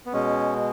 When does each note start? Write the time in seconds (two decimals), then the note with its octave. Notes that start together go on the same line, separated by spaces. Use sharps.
0.06 B3
0.13 B2 G#3 C#4